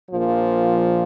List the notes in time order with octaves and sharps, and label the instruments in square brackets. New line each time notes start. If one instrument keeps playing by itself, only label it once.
[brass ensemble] A#1 A#2 F3